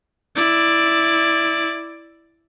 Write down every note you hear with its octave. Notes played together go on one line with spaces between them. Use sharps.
E4 D5